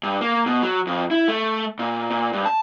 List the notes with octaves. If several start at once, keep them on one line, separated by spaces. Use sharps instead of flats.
G2
A#3
B2
F#3
F2
E4
A3
A#2
A#2
G2
A5